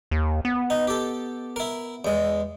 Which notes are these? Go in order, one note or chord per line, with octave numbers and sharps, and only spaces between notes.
D#2
B3
D#4
G4 A4
E4 A#4
E2 G#3